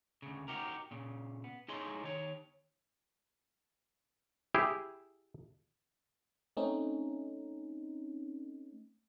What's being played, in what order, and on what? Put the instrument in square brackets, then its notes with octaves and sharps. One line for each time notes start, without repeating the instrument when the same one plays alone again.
[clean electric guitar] D2 C#3
D#4 F#4 G4 A#4
A#2 C#3
B3
D#4 E4 G#4 C#5 D#5 C6
D#3 C#5
[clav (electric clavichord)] E4 G4 G#4
[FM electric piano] A3 C4 C#4 D#4